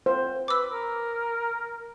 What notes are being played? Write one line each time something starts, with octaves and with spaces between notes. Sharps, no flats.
C5
B4 D6 E6
A#4